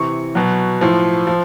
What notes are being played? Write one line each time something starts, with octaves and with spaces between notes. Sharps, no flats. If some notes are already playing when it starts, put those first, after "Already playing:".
Already playing: C3 E3 C#6
B2 F#3
A2 F3
F3